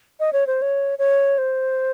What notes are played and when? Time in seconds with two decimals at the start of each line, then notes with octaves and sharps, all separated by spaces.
0.20 D#5
0.33 C#5
0.47 C5
0.62 C#5
0.99 C#5
1.38 C5